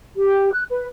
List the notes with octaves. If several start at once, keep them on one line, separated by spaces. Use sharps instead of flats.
G4
F#6
B4